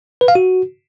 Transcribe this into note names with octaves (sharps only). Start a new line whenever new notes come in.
B4
F5
F#4